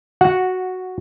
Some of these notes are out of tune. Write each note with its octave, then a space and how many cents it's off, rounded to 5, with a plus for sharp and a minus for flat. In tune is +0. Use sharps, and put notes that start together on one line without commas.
F#4 +0 F#5 -10